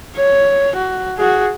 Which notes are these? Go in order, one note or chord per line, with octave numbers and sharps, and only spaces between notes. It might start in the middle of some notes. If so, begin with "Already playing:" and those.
C#5
F#4
F#4 G#4